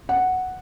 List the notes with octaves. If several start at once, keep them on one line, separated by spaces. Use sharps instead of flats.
F#5